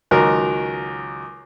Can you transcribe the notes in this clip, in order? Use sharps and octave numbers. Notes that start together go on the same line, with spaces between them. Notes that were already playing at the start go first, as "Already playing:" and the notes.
C#2 D#3 F#3 A#4